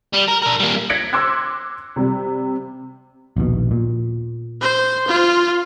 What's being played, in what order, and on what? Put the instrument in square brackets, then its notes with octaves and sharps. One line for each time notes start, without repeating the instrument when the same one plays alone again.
[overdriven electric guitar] G3
A#4
D4 A#4
G3 A#3
[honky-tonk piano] G#6 A#6 B6 C#7 D7 F#7
C6 D6 E6 F#6 G#6
C3 G3
[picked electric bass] A#1 D#2 B2
A#2
[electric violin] C5
F4